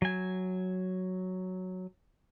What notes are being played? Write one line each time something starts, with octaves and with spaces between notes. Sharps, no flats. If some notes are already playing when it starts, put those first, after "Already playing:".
F#3 G#5